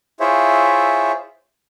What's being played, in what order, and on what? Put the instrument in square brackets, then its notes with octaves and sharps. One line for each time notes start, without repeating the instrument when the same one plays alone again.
[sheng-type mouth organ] E4 F4 G#4 C5 C#5 E5